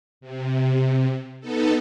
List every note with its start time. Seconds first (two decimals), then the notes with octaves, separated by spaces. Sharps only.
0.21 C3
1.40 B3 D#4 A4